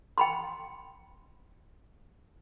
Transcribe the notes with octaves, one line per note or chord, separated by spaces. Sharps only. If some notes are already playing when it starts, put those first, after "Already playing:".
G5 B5 C6